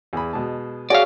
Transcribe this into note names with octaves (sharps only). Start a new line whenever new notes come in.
E2 G#4 B5
B2 G#3 A5
F#4 G#4 C#5 D5 E5 F5